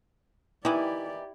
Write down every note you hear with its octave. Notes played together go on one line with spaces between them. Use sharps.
D#3 E3 E4 G4 D5